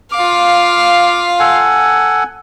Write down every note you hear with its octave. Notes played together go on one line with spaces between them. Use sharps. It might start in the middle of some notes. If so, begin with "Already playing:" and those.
F4 F5 D6
A4 F#5 G#5